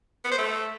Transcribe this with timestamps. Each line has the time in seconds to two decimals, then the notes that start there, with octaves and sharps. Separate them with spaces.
0.24 B3
0.31 C5
0.38 A3